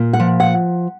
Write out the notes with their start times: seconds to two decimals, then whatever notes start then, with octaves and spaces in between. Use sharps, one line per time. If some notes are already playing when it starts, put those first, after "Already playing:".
Already playing: A#2
0.13 F#5
0.20 F3
0.40 F#5